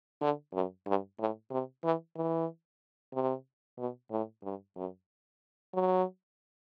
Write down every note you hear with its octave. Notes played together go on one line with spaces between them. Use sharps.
D3
F#2
G2
A2
C3
E3
E3
C3
B2
A2
G2
F#2
F#3